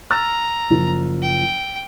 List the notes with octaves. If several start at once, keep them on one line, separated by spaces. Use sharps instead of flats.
A#5 E6 F6 A6
F#1 F3
G5